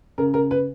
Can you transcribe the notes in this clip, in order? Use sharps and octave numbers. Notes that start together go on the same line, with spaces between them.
C#3 A#4
C#3 A#4
B4